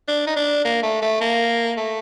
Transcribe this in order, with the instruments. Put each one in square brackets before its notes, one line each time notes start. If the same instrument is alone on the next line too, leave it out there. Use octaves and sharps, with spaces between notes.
[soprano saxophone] D4
D#4
D4
A#3
A3
A3
A#3
A3